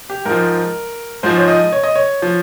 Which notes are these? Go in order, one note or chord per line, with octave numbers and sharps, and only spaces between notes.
G4
G#2 F3 A#4
G#2 F3 C5
C#5
D#5
C#5
D#5
C#5
F3